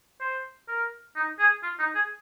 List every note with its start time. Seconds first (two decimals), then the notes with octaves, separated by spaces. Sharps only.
0.20 C5
0.68 A#4
1.16 D#4
1.39 G#4
1.63 F4
1.79 D#4
1.95 G#4